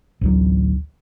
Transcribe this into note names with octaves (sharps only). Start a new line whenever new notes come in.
A1 D2 F#3